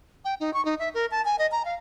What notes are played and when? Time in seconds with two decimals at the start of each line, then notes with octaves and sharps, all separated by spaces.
0.25 G5
0.40 D#4
0.54 C#6
0.65 D#4
0.79 E5
0.94 A#4
1.11 A5
1.25 G#5
1.39 D#5
1.52 A#5
1.65 F5